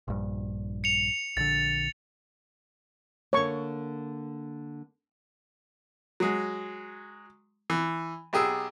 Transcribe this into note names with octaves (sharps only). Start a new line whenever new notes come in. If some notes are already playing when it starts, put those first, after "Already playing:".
A#1 G2
C#7 F7
A#1 D3 A6
D3 A#3 C#5 C#6
F#3 G#3
E3
B1 G4 G#4 E6